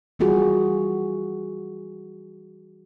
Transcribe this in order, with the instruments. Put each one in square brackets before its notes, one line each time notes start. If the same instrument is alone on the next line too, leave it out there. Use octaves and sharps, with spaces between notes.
[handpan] E3 G3 F4 F#4 G#4